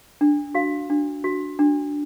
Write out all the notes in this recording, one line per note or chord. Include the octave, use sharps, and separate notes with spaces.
D4
F#4 F5
D4
F#4
D4